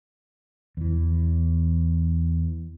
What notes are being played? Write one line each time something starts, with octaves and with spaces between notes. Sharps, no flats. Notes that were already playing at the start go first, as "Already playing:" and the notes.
E2 E3